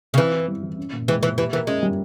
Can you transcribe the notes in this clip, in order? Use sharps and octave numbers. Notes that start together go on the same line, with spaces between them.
C#3
E3 C4
E4
G3
E3
C#4
A#2
E3 G#3
A#2 E3
E3 G4
E3 A#4
G#3 C#4
G3